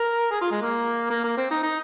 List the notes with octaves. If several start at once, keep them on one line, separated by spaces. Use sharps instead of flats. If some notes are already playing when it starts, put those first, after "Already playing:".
Already playing: A#4
G#4
F4
G#3
A#3
A#3
A#3
C4
D#4
D#4